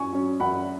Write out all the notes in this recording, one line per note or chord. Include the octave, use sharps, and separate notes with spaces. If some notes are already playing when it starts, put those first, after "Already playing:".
Already playing: F#2 G#5 C#6
F#3 C#4
F#2 F#5 B5